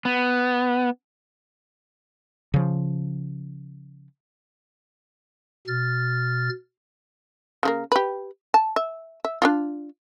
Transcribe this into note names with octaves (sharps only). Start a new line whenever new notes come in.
B3
C#3 F3
B2 F6 A6
C#3 F3 A#3
G4 B4
A5
E5
E5
D4 D#4 F4